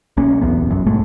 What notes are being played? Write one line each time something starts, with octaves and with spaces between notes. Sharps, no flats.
B1 A#3 C#4
D1 B1 E2 B3
F1 F#2
B1 G#2 G#3 A3